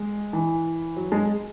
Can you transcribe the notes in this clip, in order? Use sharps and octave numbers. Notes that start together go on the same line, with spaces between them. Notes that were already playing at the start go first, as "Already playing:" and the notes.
Already playing: G#3
E3
F#3
G#3